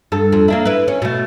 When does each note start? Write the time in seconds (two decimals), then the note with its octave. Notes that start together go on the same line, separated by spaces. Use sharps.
0.12 G2 A4
0.32 F2
0.48 A#3 D4 E4
0.65 E4 B4
0.88 C#4
1.02 B2 A3